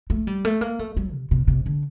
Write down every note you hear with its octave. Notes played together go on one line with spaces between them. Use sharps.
A3
G3
A3
A#3
A3
G3
C3
C3
C3
D3